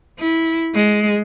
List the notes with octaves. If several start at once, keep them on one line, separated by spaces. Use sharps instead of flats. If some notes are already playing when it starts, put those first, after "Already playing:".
E4
G#3